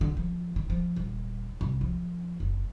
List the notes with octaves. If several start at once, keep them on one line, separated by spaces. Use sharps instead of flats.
D3
F3
D#3
F3
D#1
C2
F3
F#1